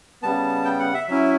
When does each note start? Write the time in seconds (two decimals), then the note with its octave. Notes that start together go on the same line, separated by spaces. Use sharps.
0.22 C#3 G3 B3 A5
0.65 G5
0.79 F#5
0.94 E5
1.08 F#3 C#4 E4 E5